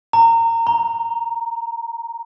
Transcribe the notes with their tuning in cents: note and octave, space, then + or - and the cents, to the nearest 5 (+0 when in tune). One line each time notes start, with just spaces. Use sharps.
A#5 -25
A#5 +10